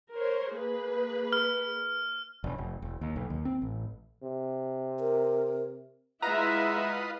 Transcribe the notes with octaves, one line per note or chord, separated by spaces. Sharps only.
A#4 C5 C#5
A#3 G#4 B4
F6
E1
F1
E1
D#2
B1
D#2
C4
A1
C3
A#4
G#3 E4 F4 B4 D#5 E5 F#5 A#5